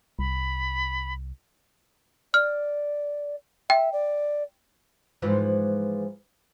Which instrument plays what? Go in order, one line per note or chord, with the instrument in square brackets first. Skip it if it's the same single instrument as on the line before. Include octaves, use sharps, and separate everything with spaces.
[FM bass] C2 [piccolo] B5
[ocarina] D5 [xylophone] F6
[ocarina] E5 [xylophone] G5
[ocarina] D5
[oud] G#2 E3 F3